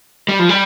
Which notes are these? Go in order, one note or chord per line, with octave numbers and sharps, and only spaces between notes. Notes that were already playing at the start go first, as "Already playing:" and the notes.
G3
F3
G3